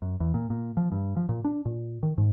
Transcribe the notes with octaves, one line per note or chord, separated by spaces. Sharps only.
F#2
E2
A#2
A#2
F3
G2
F3
A#2
D4
A#2
D#3
G#2